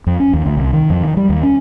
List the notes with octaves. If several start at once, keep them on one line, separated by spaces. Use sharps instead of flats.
F2
C#4
D#2
D2
C2
D#3
F2
D#3
G3
D#2
C#4